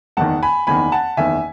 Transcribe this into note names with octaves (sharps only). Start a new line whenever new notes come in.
F#1 E2 D#3 F#5 A5
G#5 B5
F#1 E2 D#3 G#5 B5
F#5 A5
F#1 E2 D#3 E5 G#5